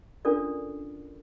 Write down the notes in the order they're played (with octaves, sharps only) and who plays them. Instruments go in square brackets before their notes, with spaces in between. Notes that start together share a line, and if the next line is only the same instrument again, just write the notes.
[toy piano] C#4 D4 F4 A4 A#4 D5